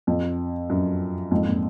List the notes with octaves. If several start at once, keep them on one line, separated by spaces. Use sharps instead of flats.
F2
F#2
F2 G#2
A#2